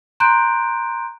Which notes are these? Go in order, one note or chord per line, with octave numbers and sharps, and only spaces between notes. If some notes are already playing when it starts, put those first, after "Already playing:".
A#5 C6 F#6 G6 D7